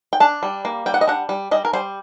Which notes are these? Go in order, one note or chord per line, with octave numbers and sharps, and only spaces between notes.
G5
D4 A5
G3
A#3
G3 G5
F#5
D#5
D4 F#5
G3
G3 D#5
A#4
G3 C5